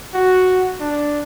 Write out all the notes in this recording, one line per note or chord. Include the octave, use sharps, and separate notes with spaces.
F#4
D4